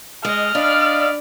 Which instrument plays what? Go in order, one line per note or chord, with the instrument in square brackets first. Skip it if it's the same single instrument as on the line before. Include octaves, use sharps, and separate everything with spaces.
[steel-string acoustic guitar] G#3 [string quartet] D#5 [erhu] F6
[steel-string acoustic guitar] D4 [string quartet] D5 B5 [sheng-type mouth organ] D#5 F5